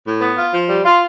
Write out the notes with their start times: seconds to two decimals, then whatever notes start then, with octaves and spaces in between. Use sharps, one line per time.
0.06 A2
0.21 B3
0.37 F4
0.53 F3
0.69 G3
0.85 F4